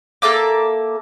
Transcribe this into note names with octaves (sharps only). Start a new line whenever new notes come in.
A#3 A4 E5 D6